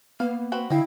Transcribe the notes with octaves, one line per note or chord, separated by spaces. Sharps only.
A#3 B3 F5
C4 F#4 B4
D3 E4 D#5 F5 G5